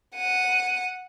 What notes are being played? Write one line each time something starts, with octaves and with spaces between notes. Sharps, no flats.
F#5 D#7